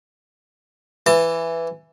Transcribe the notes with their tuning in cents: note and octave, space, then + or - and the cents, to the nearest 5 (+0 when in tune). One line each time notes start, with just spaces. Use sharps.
E3 +10 A5 +35